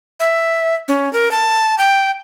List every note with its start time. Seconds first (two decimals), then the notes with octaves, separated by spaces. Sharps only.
0.20 E5
0.88 C#4
1.13 A#4
1.31 A5
1.78 G5